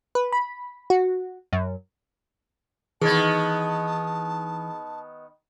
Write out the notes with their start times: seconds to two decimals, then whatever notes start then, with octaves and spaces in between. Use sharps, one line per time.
0.15 B4
0.32 B5
0.90 F#4
1.53 F#2
3.01 D#3 E3 B3 G#4 A5 G#6